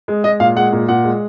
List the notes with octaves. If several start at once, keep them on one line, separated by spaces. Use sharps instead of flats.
G#3
G#3 D#5
A#2 F5
G#3 F#5
A#2
A#2 F#5
G#3